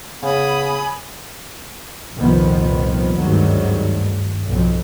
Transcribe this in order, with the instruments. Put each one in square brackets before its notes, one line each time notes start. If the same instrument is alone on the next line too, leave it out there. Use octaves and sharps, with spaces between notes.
[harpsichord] C#3 [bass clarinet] B3 [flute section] G#5 B5 D#6
[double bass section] C2 F2 A#2 D#3 F3 B3
G#1 D2 G2 D#3 F#3
B1 F2